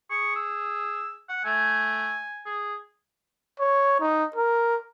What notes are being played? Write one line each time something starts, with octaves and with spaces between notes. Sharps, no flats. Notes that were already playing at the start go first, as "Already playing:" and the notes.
G#4 C#6
E6
F#5
A3 G#5
G#4
C#5
D#4
A#4